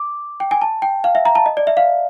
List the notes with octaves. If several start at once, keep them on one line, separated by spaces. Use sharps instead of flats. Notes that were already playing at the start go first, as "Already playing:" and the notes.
Already playing: D6
G5
G#5
A5
G5
F5
E5
A#5
A5
D#5
D5
E5
F5